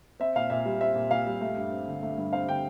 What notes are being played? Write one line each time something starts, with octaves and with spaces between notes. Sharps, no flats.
C4 E5
A#2 F5
A#2 E5
G3
C4 E5
A#2
A#2 F5
G3
A3
G2
C4
D3
A3
G2
C4 F5
D3 G5